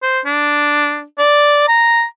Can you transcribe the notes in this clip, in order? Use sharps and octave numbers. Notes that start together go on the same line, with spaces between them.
C5
D4
D5
A#5